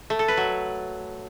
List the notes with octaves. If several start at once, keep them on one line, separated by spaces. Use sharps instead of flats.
A3
A4
B4
F#3